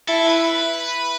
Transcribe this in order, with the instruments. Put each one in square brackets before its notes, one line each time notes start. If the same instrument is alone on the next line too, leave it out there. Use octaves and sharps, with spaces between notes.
[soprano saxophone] E4 [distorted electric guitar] A4
[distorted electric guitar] B4